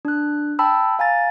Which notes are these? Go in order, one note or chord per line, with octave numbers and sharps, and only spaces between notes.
D4 F#6
G5 A5 B5 E6
F5 G#5 A#5 A6